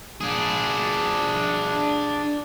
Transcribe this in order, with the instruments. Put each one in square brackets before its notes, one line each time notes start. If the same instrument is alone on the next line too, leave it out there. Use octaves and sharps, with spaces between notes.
[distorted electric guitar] D4 G#4